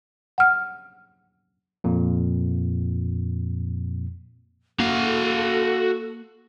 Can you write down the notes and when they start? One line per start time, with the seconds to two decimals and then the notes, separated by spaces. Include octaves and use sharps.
0.38 F#5 F6
1.84 F2 A#2
4.80 A#3 F#4 A4 F5